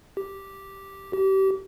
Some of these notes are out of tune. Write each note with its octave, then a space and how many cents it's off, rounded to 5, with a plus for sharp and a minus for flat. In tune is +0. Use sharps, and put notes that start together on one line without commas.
G4 -5
G4 -30